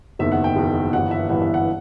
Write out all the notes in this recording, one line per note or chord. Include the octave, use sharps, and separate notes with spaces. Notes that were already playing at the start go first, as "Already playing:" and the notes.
F#1 E2 D#3 E5
F#5
G5
F#1 E2 D#3
G1 G2 E3 F#5
E5
G1 G2 E3 F#5
E5
F#5